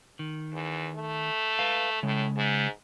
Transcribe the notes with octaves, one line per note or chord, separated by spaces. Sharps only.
D#3
E2
A3
B4 F5
A2 C#3 G#3
G#2